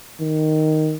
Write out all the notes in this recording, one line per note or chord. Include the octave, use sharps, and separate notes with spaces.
D#3